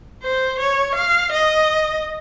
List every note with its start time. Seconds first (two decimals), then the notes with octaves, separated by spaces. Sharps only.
0.23 C5
0.60 C#5
0.95 F5
1.32 D#5